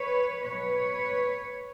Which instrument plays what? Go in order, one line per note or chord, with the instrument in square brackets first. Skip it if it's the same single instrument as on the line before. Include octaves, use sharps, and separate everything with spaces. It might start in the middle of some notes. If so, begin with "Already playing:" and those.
Already playing: [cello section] B4 C#5
B2 F#3 B4 C#5